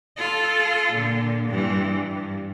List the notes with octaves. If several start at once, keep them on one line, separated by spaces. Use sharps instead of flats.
F4 A4
A#2 D3
G2 E3
G2